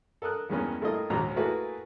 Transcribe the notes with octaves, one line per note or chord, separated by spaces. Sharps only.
A4 A#4 D#6 F#6
E2 G2 G#3 A#3 B3 C#4
G2 A3 A#3 E4 F4 D#5
A#1 D#2 G#2 G3 F#4 A#5
A3 A#3 E4 F#4 G#4 B4